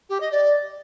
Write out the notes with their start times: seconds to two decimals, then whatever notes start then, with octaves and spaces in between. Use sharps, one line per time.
0.09 G4
0.20 D#5
0.31 D5